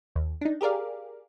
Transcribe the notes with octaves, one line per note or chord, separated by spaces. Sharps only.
D#2
D4 D#4
G4 G#4 A#4 D5 F5